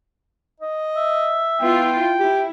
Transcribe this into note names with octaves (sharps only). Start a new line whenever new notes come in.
D#5
E5
B3 E4 F4 G5
E4 G4